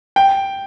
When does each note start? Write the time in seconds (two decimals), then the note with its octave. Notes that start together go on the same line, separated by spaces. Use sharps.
0.16 G5